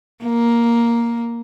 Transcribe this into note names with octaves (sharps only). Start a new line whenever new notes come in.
A#3